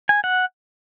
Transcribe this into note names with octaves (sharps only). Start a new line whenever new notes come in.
G#5
F#5